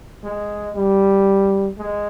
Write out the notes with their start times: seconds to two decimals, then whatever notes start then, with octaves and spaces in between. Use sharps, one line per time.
0.24 G#3
0.76 G3
1.78 G#3